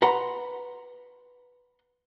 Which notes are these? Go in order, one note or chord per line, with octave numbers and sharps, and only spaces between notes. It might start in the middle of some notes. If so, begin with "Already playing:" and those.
B4 F#5 A#5 C6